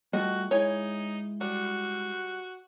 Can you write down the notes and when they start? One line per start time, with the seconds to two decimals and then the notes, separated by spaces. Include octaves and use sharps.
0.13 G3 A3 F4 F#4 D#5
0.51 G#3 D#4 E4 C#5 G#5
1.41 G3 F#4